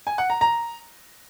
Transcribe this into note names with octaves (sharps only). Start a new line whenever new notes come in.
G#5
F#5
A#5
A#5